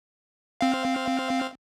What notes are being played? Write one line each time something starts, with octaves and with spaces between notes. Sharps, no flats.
C4 F5